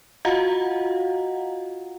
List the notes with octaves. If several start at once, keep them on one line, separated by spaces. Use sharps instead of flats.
F4 F#4 D#5 F5 F#5 A#5